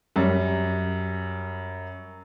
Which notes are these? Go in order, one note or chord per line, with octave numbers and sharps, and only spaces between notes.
F#2 G3